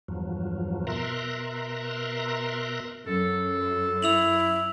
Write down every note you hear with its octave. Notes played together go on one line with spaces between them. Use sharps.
E2 G2 F3 F#3
B2 A#4 E5 A#5 C6 F#6
F#2 A4
E4 E6 F7 F#7